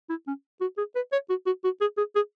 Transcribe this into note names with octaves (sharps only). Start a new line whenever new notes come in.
E4
C#4
F#4
G#4
B4
C#5
F#4
F#4
F#4
G#4
G#4
G#4